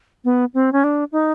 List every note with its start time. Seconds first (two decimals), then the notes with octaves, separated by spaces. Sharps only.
0.24 B3
0.54 C4
0.72 C#4
0.84 D4
1.12 D#4